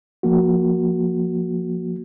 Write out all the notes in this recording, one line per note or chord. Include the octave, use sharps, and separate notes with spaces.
F3 A#3 F#4